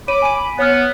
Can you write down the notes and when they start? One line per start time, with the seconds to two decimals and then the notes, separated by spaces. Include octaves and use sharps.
0.08 C#5 B5 D6 D#7
0.22 G#5 D#7
0.59 B3 C#5 F6